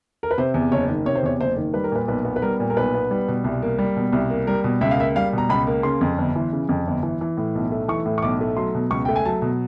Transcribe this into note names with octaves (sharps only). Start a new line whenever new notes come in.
A#4
B4
C3 C5
E2
F#1 C#5
D#3
C3 C#5
C5
E2 C#5
F#1 C5
D#3
G3 B4
A#4
A#2 B4
B1 B4
B3
B4
G3 A#4
A#2
A#4
B1 B4
B3
G3
B2
C2
A#3
G3
B2
C2
A#3
G3 A#4
B2
C#2 E5
F5
A#3 E5
G3 F5
B2 A#5
C#2 B5
A#3
C#3 C6
F2
G1
E3
C#3
F2
G1
E3
E3
A2
B1
A3
E3 C#6
A2
C#6
B1 D6
A3
F#3 C6
B2
C#2 C#6
A3 G5
G#5
F#3 A5
B2